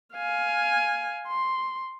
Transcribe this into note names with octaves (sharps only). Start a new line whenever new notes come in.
F5 G#5
C6